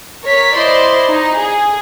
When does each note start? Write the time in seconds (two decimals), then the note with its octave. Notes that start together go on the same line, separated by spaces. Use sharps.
0.23 A#4 C#5 B6
0.56 E4 C5 D5 D#5 C6
1.08 D#4
1.39 G#4